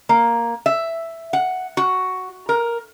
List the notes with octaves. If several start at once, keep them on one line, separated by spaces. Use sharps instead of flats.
A#3
E5
F#5
F#4
A#4